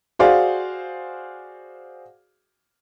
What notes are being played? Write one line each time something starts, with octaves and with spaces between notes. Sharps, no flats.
F#4 G#4 C5 D5 F5